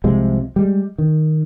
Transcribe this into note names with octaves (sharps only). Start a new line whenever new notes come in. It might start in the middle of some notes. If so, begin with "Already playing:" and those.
C2 C3 F3 G#3
G3 G#3
D#3